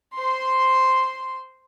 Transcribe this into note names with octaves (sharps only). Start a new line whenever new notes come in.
C5 C6